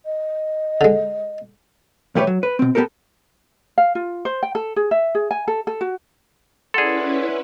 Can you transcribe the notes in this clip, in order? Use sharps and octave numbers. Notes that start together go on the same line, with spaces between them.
D#5
D3 G#3
B1 E2 A3 G4 B4 C#5
F#3
B4
B2 C4
B3 C#4 G4 A4 A#4
F5
F4
C5
G5
A4
G#4
E5
G#4
G#5
A4
A4
F#4
C#4 E4 G#4 A4 B4 D5 F#5 C6